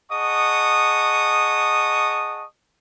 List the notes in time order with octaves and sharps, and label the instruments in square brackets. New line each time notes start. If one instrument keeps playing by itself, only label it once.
[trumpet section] G#4 D#5 F#5 A5 C#6 D#6